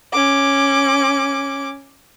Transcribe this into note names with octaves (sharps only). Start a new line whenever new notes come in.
C#4 D6